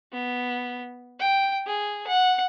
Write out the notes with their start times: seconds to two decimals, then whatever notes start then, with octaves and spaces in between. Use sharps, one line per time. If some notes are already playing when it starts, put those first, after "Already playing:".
0.13 B3
1.19 G5
1.66 G#4
2.07 F#5